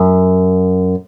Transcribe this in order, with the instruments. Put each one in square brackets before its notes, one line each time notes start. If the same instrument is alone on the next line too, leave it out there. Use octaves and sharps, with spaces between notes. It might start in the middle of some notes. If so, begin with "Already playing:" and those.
Already playing: [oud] F#2